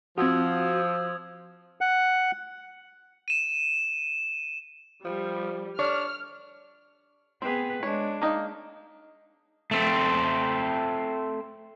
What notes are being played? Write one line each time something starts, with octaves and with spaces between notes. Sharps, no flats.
F3 C4 F#4 D#6 E6 G#6
F#5
D#7 E7
F3 G3
D4 C#5 F6
B3 C4 G#4 B4
G#3 D4 C#5
A#3 D#4
A3 C4